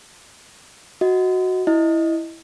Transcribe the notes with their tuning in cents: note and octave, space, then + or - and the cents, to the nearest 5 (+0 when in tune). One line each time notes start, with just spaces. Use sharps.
F#4 +0 D#5 +20
E4 +0 D#5 +0